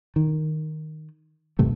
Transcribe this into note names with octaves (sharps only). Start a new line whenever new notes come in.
D#3
D#1 G2 C3 A3